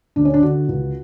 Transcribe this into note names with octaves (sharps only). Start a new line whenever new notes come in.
D2 D4
C#4
D4
D3 F#4
C#2